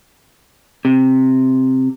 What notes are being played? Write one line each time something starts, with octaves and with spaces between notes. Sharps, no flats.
C3